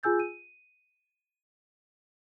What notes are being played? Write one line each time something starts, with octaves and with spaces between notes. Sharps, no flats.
F4 G#4 G#5 E6 G6 A6
D#7